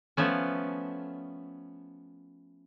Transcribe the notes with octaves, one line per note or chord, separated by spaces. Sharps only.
F3 A3 B3 C#4